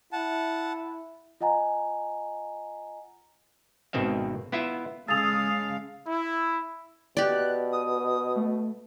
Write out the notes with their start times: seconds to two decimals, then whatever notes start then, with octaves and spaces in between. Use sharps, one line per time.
0.12 E4 F#5 A5
1.41 F4 D#5 F#5 G#5 A#5
3.93 G#1 B2 D#3 C4 E5 F5
4.52 B3 E4 F4 E5
5.08 C#3 G#3 G#4 A4 F5 D#6 A6 F7
6.07 E4
7.17 B2 G4 D5 F#6
7.72 D#6
8.36 A3